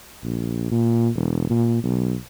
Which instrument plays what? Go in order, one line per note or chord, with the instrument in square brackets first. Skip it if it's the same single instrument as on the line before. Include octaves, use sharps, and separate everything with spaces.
[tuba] A#1
A#2
E1
A#2
B1